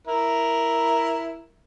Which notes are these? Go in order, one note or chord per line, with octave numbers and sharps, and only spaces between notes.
E4 A#4